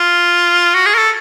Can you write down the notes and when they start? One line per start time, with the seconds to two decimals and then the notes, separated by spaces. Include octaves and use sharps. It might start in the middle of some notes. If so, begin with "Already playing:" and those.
Already playing: F4
0.74 F#4
0.86 G#4
0.94 A#4
0.98 A4